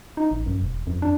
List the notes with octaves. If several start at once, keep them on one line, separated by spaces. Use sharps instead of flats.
D#4
A1
F#2
E1
F2
D4